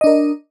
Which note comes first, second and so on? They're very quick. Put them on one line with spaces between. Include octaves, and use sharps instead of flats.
D#5 D4 A#4